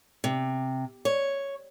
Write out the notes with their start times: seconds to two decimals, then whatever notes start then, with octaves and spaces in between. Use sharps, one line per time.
0.24 C3
1.05 C#5